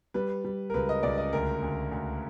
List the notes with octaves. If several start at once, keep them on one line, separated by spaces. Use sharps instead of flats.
G3 B4
G3
A#4
C#2 B4
D#5
C#2 D5
D#5
D2 A#4
D2
D2